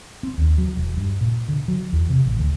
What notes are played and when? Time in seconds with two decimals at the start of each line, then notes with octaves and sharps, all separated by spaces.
0.23 C4
0.38 D#2
0.58 F#3
0.77 E1
0.97 G2
1.21 A#2
1.48 D3
1.68 F#3
1.93 E2
2.10 C3
2.25 A1
2.39 D2